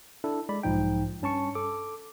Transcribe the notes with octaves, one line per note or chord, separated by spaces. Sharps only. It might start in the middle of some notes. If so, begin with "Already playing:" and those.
D4 E4 A4
G#3 D5 B5
B1 G#2 F3 D#4 G5
G2 C#4 A5 C#6 C#7
A4 D6